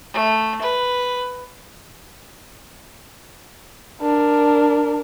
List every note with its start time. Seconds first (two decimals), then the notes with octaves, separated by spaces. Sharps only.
0.14 A3
0.61 B4
4.02 D4 A#4